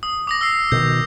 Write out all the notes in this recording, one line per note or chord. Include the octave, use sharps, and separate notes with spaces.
D#6
D6 D#6 A#6
E6 C7
B2 D3 D#3 G6